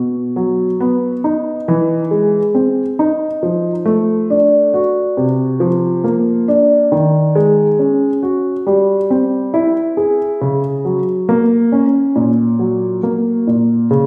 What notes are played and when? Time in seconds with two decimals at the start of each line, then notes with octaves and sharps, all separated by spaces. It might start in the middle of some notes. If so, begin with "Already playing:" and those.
Already playing: B2
0.36 F#3
0.80 B3
1.24 D#4
1.68 E3
2.11 G#3
2.55 C4
2.99 D#4
3.43 F3
3.85 A3
4.30 D4
4.74 F#4
5.17 C3
5.60 F3
6.04 A#3
6.48 D4
6.92 D#3
7.35 G#3
7.79 C#4
8.23 F#4
8.67 G3
9.10 C4
9.54 E4
9.97 G#4
10.41 C#3
10.85 F#3
11.29 A#3
11.72 C#4
12.16 A#2
12.59 F#3
13.03 A#3
13.47 A#2
13.91 C#3